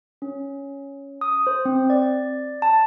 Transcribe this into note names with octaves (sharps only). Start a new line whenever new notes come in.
C#4
D#6
C5
C4
D5
A5